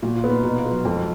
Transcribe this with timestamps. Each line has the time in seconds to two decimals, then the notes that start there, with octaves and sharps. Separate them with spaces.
0.02 A#2 F#4
0.16 F4
0.24 B3
0.30 D#4
0.43 B2 F#4
0.58 F4
0.65 B3
0.72 F#3
0.85 F2 G#3